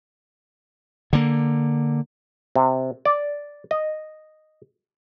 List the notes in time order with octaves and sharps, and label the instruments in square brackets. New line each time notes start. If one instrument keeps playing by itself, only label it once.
[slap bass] D3 A#3
[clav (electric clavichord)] C3
D5
D#5